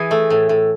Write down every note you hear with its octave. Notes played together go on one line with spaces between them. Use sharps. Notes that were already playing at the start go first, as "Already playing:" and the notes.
Already playing: E3 G#4
A3
A2
A2